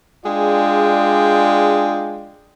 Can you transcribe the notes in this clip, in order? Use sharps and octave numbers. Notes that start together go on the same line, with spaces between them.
G#3 D4 F4 G#4 D5 G5